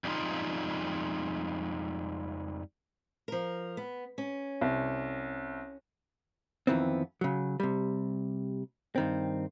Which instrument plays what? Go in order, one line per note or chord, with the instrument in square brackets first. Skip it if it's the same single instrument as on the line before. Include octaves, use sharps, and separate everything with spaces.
[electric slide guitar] F2 G3 G#3 D#4 F4
[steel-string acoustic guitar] F3 A#4
B3
C#4
[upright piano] C2
[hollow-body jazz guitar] F2 D#3 E3 B3 C4
C#3 F#3
C3 G3
G2 D#3 C4